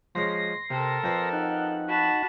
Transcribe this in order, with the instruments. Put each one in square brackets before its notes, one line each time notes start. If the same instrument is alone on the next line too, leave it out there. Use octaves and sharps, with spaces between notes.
[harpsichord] F3 G#3 C#4 [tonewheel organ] C6 A#6
[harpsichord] C3 [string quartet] A4 A#4
[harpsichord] F2 F3 B4
[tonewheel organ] D#4 F#5
[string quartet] F#4 A5 B5